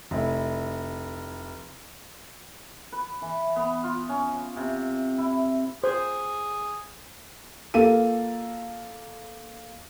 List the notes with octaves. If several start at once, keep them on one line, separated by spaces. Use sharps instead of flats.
F1 E4
B4
E3
B3
F4
C#4
C3
E4
G#4 C5
A#3 F4 A4 D#7